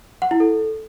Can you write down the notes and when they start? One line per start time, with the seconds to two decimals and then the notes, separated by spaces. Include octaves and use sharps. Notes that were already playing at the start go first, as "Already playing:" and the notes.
0.22 F#5
0.31 E4
0.40 A4